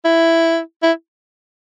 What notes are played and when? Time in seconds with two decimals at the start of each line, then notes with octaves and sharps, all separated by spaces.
0.05 E4
0.83 E4